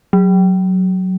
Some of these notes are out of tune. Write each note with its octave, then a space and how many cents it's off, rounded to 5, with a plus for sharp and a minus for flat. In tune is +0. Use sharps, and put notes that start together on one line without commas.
F#3 +5